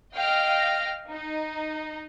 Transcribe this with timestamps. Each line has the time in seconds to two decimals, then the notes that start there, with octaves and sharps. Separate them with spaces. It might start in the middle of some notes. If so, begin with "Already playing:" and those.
0.13 D#5 F5 G5 F6 A#6
1.08 D#4